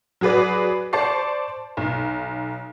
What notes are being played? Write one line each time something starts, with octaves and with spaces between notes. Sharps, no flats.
F#3 F#4 G#4 B4 D5
C5 D5 A5 C#6 C7
B1